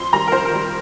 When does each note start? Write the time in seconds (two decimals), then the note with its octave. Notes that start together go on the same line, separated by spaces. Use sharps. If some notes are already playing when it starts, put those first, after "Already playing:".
Already playing: F2 C6
0.13 D#3 G3 A#5
0.27 A#4
0.32 F2 C5
0.45 A#4
0.51 D#3 G3